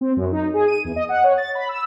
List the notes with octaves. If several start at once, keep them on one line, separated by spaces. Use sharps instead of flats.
C4
F#2
D#4
G#4
D#7
E2
D#5
F#5
C#5
A6
B5
E6